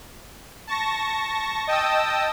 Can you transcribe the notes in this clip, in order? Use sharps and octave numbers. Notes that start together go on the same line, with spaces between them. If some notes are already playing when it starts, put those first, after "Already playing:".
A5 C#6 A#6
D#5 G5 A5 D#6 E6